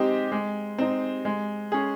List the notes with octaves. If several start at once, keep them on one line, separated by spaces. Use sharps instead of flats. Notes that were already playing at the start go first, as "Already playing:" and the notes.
Already playing: G#3 C4 D#4 G4
G#3
C4 D#4
G#3
C#4 G#4